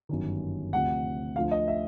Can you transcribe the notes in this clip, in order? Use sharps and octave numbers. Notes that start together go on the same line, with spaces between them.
G1 F#2 D#3
D2 C3 F3 F#5
D2 D3 F3 F5
D#5
E5